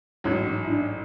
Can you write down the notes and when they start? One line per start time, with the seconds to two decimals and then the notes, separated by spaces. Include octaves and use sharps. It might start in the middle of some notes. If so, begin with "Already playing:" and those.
0.24 A1 G#2 F#3 C#4
0.46 C#4
0.64 E4
0.69 D4